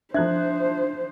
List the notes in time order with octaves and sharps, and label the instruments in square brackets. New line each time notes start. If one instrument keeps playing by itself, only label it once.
[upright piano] F3 F#6 G#6 [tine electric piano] D4 [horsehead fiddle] C5 [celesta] E5